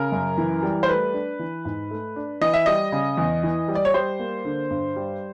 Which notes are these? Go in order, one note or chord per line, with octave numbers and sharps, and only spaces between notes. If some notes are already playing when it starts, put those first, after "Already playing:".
Already playing: C#3 A#4
F#2
E3
G3
C5
A3 B4
D4
E3
G#2
A3
D4
E3 D#5
E5
G3 D#5
C#3
E2
E3
G3
D5
C#5
G3 C5
A#3
D3
G2
G3